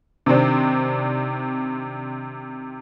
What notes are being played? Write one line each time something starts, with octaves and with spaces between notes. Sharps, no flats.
C3 D#3 C4 D4